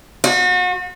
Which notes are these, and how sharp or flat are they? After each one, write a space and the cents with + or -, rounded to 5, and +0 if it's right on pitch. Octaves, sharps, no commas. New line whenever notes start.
F#4 -35